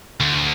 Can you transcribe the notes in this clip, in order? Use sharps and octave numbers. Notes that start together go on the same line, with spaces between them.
D2